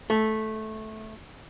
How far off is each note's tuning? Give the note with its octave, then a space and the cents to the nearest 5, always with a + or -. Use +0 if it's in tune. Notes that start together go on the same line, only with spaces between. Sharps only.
A3 -10